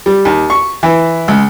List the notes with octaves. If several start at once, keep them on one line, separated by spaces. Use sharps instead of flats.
G3
D#2
C#6
E3
C#2